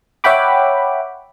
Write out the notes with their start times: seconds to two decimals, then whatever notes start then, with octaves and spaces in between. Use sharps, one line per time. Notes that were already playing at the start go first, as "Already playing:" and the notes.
0.24 C#5 E5 F#5 G5 B5 D6